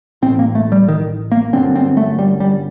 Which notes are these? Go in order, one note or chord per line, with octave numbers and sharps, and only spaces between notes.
A1 A2 C4
A#3
A3
G3
D#3
A#3
G1 F#2 D3 C4
C4
A3
G3
G3